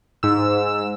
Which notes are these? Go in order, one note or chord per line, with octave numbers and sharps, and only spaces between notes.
G#2 E6